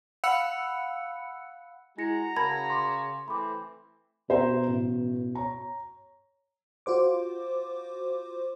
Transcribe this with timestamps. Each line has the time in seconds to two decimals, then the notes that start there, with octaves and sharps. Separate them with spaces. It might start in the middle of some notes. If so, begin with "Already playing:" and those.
0.24 F5 F#5 B5 E6 F#6 C#7
1.98 G#3 E4 F#4 A#5 A#6 C#7
2.37 C#3 A#4 A5 B5 G#6
2.70 C6 D6
3.28 E3 A3 C4 B5 D6
4.30 B2 C5 E5 A#5
4.67 A1
5.35 C#5 A#5
6.86 F4 F#4 C5 D6